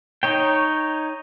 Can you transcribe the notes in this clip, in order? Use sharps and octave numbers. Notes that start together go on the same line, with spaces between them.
D#4 C#5 G5